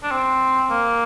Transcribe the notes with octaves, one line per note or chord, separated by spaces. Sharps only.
D4
C4
A#3